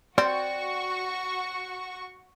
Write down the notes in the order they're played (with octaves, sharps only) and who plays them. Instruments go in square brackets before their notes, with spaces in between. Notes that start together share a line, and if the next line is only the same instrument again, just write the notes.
[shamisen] C4 [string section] F#4 C#6 [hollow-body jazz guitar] D5 G5